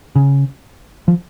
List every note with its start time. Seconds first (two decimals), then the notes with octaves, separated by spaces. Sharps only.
0.16 C#3
1.08 F3